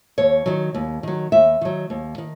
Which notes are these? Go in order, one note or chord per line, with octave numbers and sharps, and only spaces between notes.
D#2 C#5
D#3 F#3
D#2
D#3 F#3
D#2 E5
D#3 F#3
D#2
D#3